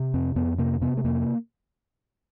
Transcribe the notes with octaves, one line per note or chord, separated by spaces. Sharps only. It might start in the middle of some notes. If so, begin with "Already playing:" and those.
Already playing: C3
F2 C4
F2 B3
C3 A#3
C3 B3
A3
F2 A#3